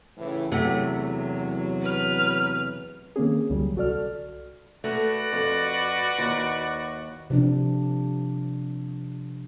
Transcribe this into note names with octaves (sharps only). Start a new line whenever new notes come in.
A2 C#3 E3
E2 C3 F#3 A3 F#5
B4 F6
D#3 A#3 C4 C#4 G#4
C#2 D3 F#3 G3
C2 F#4 A4 D5 F6
A3 F#4 B4 D5
F2
D#2
C3 F3 D4